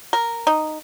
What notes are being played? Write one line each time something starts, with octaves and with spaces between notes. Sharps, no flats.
A#4
D#4